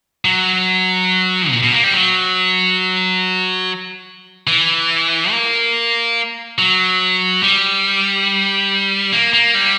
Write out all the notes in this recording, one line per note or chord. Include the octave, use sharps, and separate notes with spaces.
F#3
A#2
B2
A#3
G3
F#3
E3
A#3
F#3
G3
A#3
A#3
G3